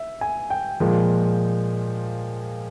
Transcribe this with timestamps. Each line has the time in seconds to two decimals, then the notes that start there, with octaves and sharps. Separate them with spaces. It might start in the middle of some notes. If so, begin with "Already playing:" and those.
Already playing: E5
0.21 G#5
0.50 G5
0.80 A#2 F3 G#3